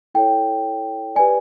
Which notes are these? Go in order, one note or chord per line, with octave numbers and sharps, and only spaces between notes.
E4 A4 C#5 G5
G4 B4 D5 G#5